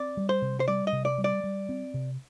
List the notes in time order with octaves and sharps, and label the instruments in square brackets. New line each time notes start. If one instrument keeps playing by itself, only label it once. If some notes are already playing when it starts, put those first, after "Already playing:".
Already playing: [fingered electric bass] C4 [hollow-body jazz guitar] D5
[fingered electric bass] G3
[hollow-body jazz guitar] C5
[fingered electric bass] C3
[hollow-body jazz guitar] C5
[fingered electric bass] G3 [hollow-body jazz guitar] D5
[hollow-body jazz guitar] D#5
[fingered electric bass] C3
[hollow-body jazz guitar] D5
[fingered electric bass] G3
[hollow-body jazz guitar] D5
[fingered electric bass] G3
C4
C3